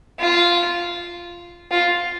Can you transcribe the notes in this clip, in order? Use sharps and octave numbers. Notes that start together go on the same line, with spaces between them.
F4
F4